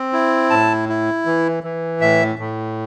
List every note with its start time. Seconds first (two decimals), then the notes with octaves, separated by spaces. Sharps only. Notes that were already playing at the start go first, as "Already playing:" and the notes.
Already playing: C4
0.13 E4
0.50 A2 A5
0.89 E4
1.26 E3
1.63 E3
2.01 A2 E5
2.39 A2